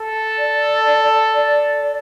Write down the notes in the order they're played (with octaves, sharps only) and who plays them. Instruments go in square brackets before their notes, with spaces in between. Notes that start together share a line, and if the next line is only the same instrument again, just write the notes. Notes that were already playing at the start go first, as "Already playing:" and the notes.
Already playing: [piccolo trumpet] A4
[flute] D5
D5